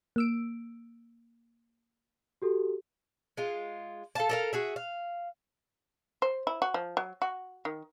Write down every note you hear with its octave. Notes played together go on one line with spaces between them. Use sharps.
A#3 E6 D7
F#4 G4 A4
G#3 F4
A4 F5 A5
A4 A#4 F5
F#4 G#4 E5
F5
C5
E4
F#4
F3
F#3
F#4
D#3